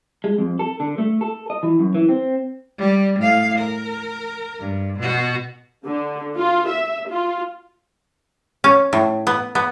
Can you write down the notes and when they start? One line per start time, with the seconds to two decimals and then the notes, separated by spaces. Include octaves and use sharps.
0.24 G#3
0.38 F2
0.59 A4
0.80 D3
0.98 A3
1.21 A4
1.50 D#5
1.63 E3
1.79 F#2
1.95 E3
2.09 C4
2.78 G3
3.19 A2 F5
3.58 A#4
4.60 G2
4.99 B2 F#4
5.85 D3
6.36 F4
6.69 E5
7.09 F4
8.64 C#4
8.93 A2
9.27 B3
9.55 B3